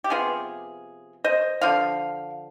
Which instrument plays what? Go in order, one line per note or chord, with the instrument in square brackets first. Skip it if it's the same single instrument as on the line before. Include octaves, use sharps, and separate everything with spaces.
[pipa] G4
C3 F3 B3 F4 G#4
C5 D#5
D3 F3 F5